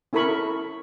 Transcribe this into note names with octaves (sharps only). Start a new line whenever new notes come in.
C#4 E4 A4 A#4 B5 C#6